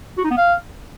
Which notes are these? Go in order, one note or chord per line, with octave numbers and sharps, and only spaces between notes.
F#4
D#4
B3
F5